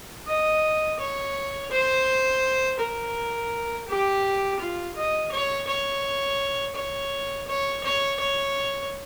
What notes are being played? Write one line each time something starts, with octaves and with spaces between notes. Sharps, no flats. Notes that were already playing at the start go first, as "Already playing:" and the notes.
D#5
C#5
C5
A#4
G4
F4
D#5
C#5
C#5
C#5
C#5
C#5
C#5